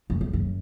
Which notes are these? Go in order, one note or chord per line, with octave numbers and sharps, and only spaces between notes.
F#2
E2
F#2